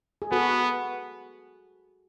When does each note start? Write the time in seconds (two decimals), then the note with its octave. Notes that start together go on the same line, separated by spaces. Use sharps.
0.22 G#4
0.32 B3 F#4 A4